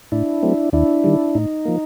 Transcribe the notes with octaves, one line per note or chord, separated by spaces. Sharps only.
A2 D4 E4
F#3 A3 C4
D#2 D4 E4
D#3 G3
A2 D#4
F3 A#3